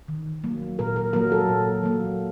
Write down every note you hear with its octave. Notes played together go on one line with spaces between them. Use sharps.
D#3
F#3 A#3
A#2 A#4
A#4
F#3 A#3 A#4
A4
A#2
F#3 A#3